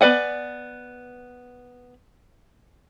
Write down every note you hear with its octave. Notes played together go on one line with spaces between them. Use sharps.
B3 B4 D5 F#5 G#5